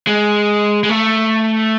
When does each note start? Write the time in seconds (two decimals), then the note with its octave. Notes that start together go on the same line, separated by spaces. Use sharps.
0.07 G#3
0.83 G#3
0.89 A3